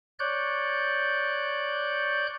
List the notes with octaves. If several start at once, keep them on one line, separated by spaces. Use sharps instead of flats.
C#5 D5 F#6 G6